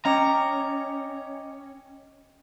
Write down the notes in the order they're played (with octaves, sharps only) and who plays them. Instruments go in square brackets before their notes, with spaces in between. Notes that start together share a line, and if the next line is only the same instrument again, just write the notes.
[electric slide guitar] C#4 [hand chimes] D#5 G5 D6 [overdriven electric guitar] A#5